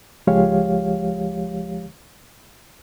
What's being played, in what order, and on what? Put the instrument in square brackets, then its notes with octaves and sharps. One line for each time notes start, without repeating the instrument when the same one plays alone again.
[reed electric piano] C#2 F3 G#3 G4 C#5 F5